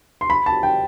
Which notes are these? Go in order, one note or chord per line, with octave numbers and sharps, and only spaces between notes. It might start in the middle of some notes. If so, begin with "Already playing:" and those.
C6
B5
A5
G5